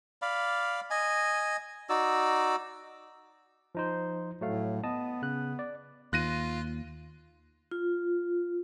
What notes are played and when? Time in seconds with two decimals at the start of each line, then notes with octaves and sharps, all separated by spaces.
0.22 D5 F5 B5
0.90 D#5 G#5
1.89 D#4 F#4 D5 E6
3.75 F3 D#4 C5
4.41 A2 F#3 A3 F5
4.84 B3 D#5 A5 D#6
5.22 C#3 F#6
5.59 D5
6.13 D#2 F4 F#6 A#6 D#7
7.71 F4